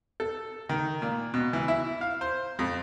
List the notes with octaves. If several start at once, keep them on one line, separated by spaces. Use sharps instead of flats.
A4
D#3
A#2
B2
E3
E4
F5
C5
F2